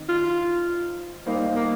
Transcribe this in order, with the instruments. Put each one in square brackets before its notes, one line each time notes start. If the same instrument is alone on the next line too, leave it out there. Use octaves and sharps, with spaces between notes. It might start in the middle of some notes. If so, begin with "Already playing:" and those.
Already playing: [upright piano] D#3 C4 D#4
[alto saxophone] F4
[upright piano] G3 D#4 G4 C5 F5 [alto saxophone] A#3
[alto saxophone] A#3